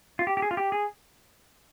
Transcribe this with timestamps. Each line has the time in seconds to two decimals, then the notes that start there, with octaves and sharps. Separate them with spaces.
0.19 F4
0.27 G4
0.37 G4
0.42 G#4
0.51 F4
0.57 G4
0.72 G#4